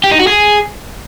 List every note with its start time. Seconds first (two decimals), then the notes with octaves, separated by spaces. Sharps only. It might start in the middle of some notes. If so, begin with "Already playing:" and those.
0.04 G4
0.11 D#4
0.19 F#4
0.27 G#4